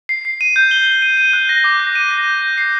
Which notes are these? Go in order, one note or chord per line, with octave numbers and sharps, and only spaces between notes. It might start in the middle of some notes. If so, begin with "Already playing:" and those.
C7
C7
D#7
G6
G7
G7
D#7
D#7
F#6
A#6
D6
A#6
D#7
A#6
G6
G6
C7